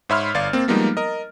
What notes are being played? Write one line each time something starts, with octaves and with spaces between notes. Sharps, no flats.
G#2 C#5 E5 B5 C6 F6
G1 D5 F5 A6
A#3 C4
F3 G3 G#3 A#3 B3 D#4
A#4 D#5